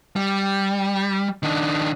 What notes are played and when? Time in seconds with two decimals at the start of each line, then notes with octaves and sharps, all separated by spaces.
0.16 G3
1.43 D#3 D4